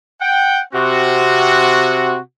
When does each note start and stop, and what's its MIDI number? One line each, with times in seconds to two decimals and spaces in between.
0.21 0.60 78
0.21 0.60 79
0.74 2.18 48
0.74 2.18 60
0.74 2.18 66